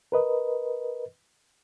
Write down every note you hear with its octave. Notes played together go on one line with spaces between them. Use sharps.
A#4 B4 D#5